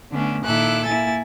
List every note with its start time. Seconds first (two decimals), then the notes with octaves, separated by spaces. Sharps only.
0.11 D3 A3 B3 C#4 D4
0.45 A#2 D#3 E4 A4 D6 F#6
0.86 A#3 E4 G#5 A6